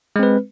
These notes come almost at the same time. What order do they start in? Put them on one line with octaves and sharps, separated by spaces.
G#3 C4 B4